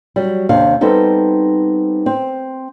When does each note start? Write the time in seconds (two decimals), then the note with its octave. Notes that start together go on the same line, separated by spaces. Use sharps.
0.16 F#3 G3
0.49 D#2 C3 D4 F5
0.81 G3 B3 C4 D#4 A4
2.06 C4